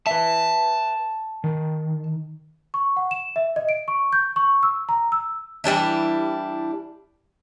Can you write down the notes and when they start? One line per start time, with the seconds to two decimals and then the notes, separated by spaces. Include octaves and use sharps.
0.07 B4 E5 A5
1.44 D#3
2.74 C#6
2.96 F#5
3.11 E7
3.36 E5
3.56 D#5
3.69 D7
3.88 C#6
4.13 G6
4.36 C#6
4.63 E6
4.89 A#5
5.12 E6
5.64 E3 G3 D4 E4